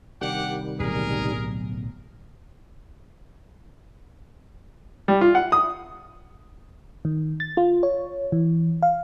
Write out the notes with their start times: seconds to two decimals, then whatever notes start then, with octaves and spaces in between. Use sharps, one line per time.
0.21 C3 D#3 G3 D4 G4 F#5
0.80 D1 B1 G#4 A#4
5.08 G3
5.21 F4
5.35 F#5
5.52 D#6
7.05 D#3
7.40 A6
7.57 F4
7.83 C#5
8.32 E3
8.82 F5